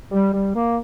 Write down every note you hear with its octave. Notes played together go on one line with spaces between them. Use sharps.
G3
G3
A#3